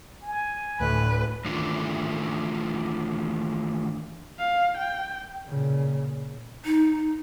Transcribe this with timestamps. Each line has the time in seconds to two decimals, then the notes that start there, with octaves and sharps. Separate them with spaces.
0.22 G#5
0.80 D2 A2 D3 B4
1.45 D#3 E3 A3 D4 E4 F4
4.39 F5
4.77 G5
5.49 A#2 C#3
6.65 D#4